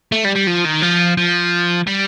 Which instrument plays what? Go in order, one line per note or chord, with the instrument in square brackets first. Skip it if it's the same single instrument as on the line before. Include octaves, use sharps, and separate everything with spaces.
[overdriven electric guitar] A3
G3
G3
F3
D#3
F3
F3
G3